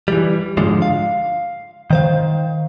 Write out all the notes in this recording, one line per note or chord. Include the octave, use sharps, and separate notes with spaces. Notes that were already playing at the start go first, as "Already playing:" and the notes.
E3 G3
G#2 D3 F3 G#3
F5
D#3 C5 F5